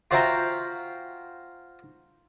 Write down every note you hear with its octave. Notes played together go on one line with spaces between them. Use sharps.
F4 F#4 C5 E5 G5 A#5